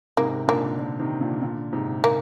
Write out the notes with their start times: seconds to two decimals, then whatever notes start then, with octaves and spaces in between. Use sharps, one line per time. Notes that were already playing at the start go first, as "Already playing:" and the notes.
0.17 G#2 C3 A#3
0.48 A#2 D3 A#3
0.79 A#2 D3
0.99 C3 D#3
1.21 A#2 D3
1.42 A#2 D3
1.73 G#2 C3
2.04 A#3